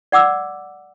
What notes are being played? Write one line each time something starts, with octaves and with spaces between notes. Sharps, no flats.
D5 F#5 D6 E6